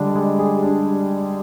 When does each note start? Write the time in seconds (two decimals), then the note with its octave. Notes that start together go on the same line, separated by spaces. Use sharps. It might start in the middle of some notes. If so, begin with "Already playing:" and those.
Already playing: D3 G3 G#3 D4
0.15 G#3
0.39 G#4
0.62 D4